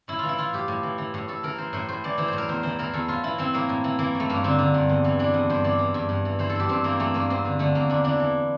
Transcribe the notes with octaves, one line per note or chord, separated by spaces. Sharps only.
A2 E4
E3 F4
E4
E3 F4
A2 G4
A2
E3
E3
A2
A2 A4
E3 A#4
E3 C5
A2 C5
A2 C5
E3 D5
E3 C5
A2 C5
A#4
E2 C5
E3 C5
E3 A#4
E2 A4
A2 F4
E3 E4
E3 C4
A2 A#3
A2
E3
E3 A#3
A2
A3
G2 A#3
D3 C4
D3
G2
E2
E3
E3 D4
E2
G2 C5
E3 D5
E3
G2
G2
E3
E3 C5
A4
G2 G4
G2 C4
E3 A#3
E3 A3
G2 A#3
E2 C4
D3
D3 A3
E2 A#3
E2 D4
E3 D4
E3